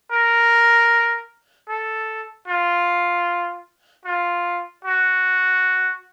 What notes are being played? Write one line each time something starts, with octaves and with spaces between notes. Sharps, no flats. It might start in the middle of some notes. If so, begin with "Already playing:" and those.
A#4
A4
F4
F4
F#4